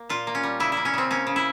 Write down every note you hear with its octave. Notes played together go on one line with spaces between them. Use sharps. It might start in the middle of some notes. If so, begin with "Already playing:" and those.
Already playing: A#3
A#2 F4
A#3
C#4
G3
C#3 E4
A#3 E4
C#4
C#3 C4
A#3 C#4
C#3
E4